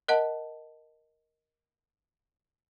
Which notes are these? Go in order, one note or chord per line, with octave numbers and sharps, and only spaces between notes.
A#4 D#5 F#5 A5